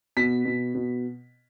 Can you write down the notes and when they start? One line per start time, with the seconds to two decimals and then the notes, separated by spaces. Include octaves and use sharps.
0.17 B2 B6
0.45 B2
0.75 B2